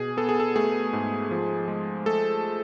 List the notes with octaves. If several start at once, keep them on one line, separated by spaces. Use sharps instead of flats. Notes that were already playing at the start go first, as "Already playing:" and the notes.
Already playing: B2 G#4
B3 A4
G#4
A4
A3 G#4
G#2
F3
G#3
A3 A4